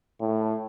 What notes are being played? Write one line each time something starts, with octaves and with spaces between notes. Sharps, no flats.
A2